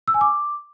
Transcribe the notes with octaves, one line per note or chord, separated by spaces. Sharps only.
E6
G#5
D6